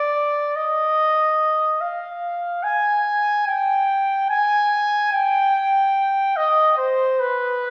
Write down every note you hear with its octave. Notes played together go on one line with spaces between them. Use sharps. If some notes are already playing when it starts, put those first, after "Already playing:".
Already playing: D5
D#5
F5
G#5
G5
G#5
G5
D#5
C5
B4